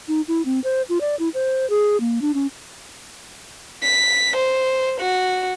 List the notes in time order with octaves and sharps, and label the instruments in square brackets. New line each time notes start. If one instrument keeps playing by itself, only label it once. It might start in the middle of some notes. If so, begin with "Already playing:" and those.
[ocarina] D#4
E4
C4
C5
F4
D5
E4
C5
G#4
A#3
D4
C#4
[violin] B6
C5
F#4